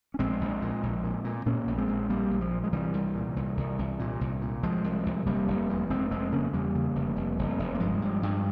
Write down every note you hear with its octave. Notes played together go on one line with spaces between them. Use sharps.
C#4
A#1 G#3 C4
A#1
A#2
A#1
A#2
A#2
A#2 A#3 C#4
A#1
G#3 C4
A#1
A#1 G3 A#3
A#1
F3
A#2
G#3
C2 E3 G3
C2
A#2
C2
C2
C2
A#2
C2
A#2
C2 F3 G#3
C2
C2
F1 G3 A#3
F1
E2
F1 G#3 C4
F1 G#3 C4
C#3 A#3 C#4
E2 G3 A#3
C#3
F1
F1
F1
F1
A#3
G2 F3 G#3
G2
G2